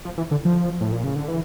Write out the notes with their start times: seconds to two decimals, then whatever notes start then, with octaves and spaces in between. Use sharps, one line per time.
0.05 F3
0.17 E3
0.31 D3
0.45 F3
0.81 A2
0.92 A#2
1.04 C#3
1.16 D3
1.28 E3